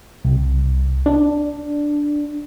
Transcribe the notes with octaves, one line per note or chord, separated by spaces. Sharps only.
C2
D4